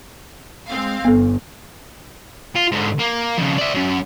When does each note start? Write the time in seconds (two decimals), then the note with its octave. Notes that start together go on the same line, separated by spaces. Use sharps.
0.68 G#3 C4 F5
1.05 G1 B3 A4
2.56 F4
2.72 G#2 D3
2.99 A#3
3.38 F2 C#3
3.59 D5 E5
3.75 F#3 C#4